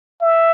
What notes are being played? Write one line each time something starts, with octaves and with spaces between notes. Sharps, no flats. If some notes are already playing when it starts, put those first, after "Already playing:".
E5